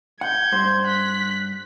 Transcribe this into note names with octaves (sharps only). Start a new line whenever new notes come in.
F#5 G6 G#6
G2 C5
F#6 B6